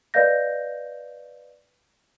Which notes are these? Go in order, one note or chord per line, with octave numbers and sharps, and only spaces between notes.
B4 D5 D#5 F5 G6 A#6